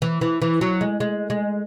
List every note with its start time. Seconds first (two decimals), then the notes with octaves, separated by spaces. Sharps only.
0.02 E3
0.21 E3
0.42 E3
0.61 F#3
0.81 G#3
1.00 G#3
1.30 G#3